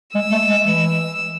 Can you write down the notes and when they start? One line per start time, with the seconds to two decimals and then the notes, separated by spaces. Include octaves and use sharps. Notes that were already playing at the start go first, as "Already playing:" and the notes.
0.14 G#3 E6
0.32 A3
0.50 G#3
0.66 E3 E6